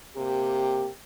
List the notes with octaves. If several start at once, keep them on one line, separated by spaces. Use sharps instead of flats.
C3 A#3 G4